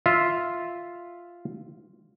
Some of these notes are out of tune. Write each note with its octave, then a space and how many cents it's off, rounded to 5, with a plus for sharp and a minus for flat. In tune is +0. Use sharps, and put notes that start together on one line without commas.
F4 +0 E5 +0